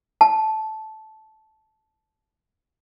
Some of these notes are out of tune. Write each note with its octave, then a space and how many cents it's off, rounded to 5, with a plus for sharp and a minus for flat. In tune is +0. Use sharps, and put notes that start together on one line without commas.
A5 -10